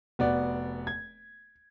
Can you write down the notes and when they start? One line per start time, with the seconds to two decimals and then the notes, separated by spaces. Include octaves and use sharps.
0.19 F1 B3 F#4 D5
0.87 G#6